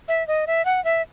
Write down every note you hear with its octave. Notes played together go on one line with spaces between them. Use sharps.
E5
D#5
E5
F#5
E5